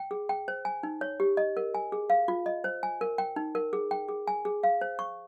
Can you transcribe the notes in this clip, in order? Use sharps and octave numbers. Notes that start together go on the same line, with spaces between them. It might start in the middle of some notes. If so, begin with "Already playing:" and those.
Already playing: G5
G#4
G5
C5
G#5
D#4
C#5
G4
D#5
A#4
G#5
G#4
F5
F4
D#5
C5
G#5
A#4
G5
D#4
A#4
G#4
G5
G#4
G#5
G#4
F5
C5
C#6